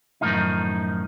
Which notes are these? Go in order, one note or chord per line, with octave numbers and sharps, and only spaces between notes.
F#2 A2 C3 D#3 F3 D#4